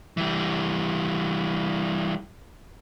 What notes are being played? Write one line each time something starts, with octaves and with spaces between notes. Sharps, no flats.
E3 G3